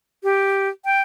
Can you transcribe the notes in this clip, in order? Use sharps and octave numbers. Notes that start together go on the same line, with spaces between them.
G4
G5